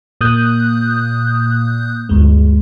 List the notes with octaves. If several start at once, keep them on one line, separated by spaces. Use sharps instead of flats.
A#2 A#3 D#6 F#6 G6
D2 G2 G#3